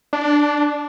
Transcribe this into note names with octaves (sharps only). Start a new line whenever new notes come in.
D4